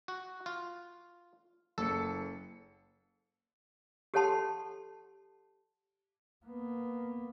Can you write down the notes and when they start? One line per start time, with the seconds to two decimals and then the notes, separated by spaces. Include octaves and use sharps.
0.08 F#4
0.46 F4
1.78 F#1 A4 C#7
4.14 G4 A4 C#5 F#5 A5 C6
6.46 A#3 B3